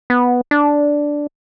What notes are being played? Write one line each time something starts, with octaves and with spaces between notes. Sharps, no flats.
B3
D4